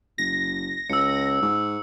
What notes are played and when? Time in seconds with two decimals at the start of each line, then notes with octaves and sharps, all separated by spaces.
0.18 F#1 A#6
0.90 C#2 E6 C#7
1.42 G#2